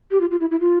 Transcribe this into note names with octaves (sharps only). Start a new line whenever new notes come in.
G4
F4
F4
E4
E4
F4